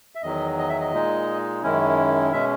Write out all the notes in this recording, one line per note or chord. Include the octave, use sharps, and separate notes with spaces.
E5
E2 D#3 F#3 D#5
D#5
E5
D#5
A#2 G#3 D#4
F#2 D#3 G#3 C#4 E4
B2 G#3 C#4 E5